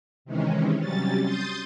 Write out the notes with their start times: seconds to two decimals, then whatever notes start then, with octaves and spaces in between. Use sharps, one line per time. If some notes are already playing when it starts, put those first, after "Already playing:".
0.25 C3 D#3 E3 G#3 C#4
0.79 C3 F#3 G3 C#4 A6
1.23 C6 D#6 G6 A6